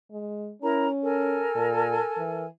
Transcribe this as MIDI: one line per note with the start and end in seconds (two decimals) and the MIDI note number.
0.11 0.52 56
0.62 1.45 61
0.62 0.86 64
0.62 0.86 70
0.62 0.86 82
1.02 2.45 69
1.02 2.45 70
1.02 2.45 80
1.55 1.99 46
2.18 2.47 52